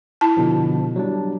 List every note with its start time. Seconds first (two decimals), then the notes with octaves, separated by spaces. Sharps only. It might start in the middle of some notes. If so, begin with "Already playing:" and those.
0.21 E4 A5
0.37 B2 D3 F3
0.96 F#3 G3 D4